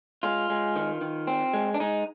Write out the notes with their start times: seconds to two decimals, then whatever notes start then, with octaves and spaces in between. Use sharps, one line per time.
0.23 G#3 F4
0.50 G#3
0.76 D#3
1.01 D#3
1.27 C4
1.53 G#3
1.74 D4
1.80 G#3 D#4